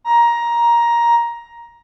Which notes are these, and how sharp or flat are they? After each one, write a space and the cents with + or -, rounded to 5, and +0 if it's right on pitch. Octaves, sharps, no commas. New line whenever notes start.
A#5 +15